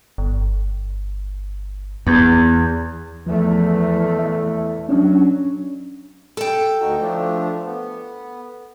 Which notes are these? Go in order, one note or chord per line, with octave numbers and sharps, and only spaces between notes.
G1
E2 B3
E2 E3 F3 A3
E5
F#3 C#4 D4
A4 G5
D2 D#4 F#4
F3 A3 D4
B3